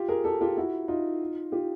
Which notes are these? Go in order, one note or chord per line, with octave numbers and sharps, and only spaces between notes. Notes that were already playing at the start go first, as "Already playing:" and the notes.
Already playing: F4 G4
G#4 A#4
G4 A4
F4 G4
E4 F#4
D#4 F4
F4 G4